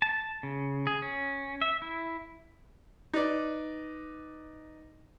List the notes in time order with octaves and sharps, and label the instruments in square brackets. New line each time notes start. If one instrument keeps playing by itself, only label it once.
[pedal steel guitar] A5
C#3
G#4
C#4
E5
E4
[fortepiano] D#4 B4 D5